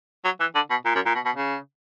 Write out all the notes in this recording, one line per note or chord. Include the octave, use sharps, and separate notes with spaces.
F#3
E3
D3
B2
A#2
F#2
A#2
B2
B2
C#3